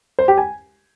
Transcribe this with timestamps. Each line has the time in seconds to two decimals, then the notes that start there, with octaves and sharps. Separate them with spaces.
0.19 C5
0.28 G4
0.38 G#5